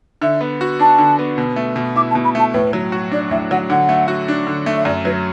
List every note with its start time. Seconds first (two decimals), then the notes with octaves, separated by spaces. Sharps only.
0.21 D3 E5
0.41 B3
0.61 F#4
0.79 D4 A5
0.98 D3
1.19 B3
1.38 B2
1.56 A3
1.76 B2
1.96 E4 D6
2.10 A5
2.15 B2
2.24 B5
2.35 A3 A5
2.53 A2 B4
2.73 F#3
2.92 F#4
3.11 D4 D5
3.30 A2 E5
3.51 F#3 F#5
3.70 D3 F#5
3.89 A3
4.08 F#4
4.28 D4
4.47 D3
4.66 A3
4.76 E5
4.85 F#2 D5
5.05 F#3 B4